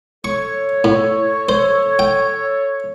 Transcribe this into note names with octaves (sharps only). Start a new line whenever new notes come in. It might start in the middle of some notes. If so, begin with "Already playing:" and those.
A4 C#5 C#6
A2
C5
G5